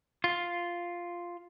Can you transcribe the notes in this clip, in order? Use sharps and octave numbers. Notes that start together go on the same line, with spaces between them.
F4